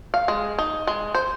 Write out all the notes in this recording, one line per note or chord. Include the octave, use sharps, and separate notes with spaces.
F5
G#3
D#4
G#3
C5